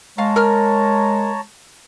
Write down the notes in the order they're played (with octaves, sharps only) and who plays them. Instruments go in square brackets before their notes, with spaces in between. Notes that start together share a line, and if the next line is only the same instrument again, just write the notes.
[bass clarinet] G#3 [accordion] C#5 A5 A#5 [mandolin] F5
[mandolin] A#4 F6